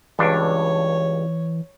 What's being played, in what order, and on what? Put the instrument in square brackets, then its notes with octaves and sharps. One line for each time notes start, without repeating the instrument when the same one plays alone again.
[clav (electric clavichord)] C#2 G2 D4 [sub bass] E3 [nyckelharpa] C#5